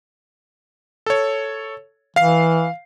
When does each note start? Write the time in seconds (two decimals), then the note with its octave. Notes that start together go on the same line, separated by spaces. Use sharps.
1.06 A4 C#5
2.16 E3 F5 C7